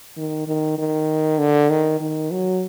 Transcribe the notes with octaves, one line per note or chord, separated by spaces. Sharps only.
D#3
D#3
D#3
D3
D#3
D#3
F#3